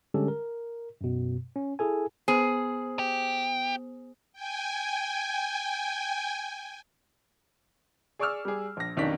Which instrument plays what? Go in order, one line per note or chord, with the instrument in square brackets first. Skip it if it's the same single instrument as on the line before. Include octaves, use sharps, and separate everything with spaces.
[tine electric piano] D3 G3 G#3 C#4 G4 A4
A#4
F#2 B2
C#4
E4 G#4 A4 G#5
[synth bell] B3 C5 [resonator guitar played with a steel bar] G#4
[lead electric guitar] G4
[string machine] G5 G#5
[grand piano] G#4 D5 C#6 D6 E6 F6
G3 G#4
A#1 A#6
F1 B1 D#3 C#4 D4 B6